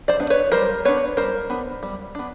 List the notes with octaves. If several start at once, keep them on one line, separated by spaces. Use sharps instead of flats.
C5 D5
B3 D4
B4 C#5
G3 A#4 C5
B3 D4 B4 C#5
G3 A#4 C5
B3 D4
G3
B3 D4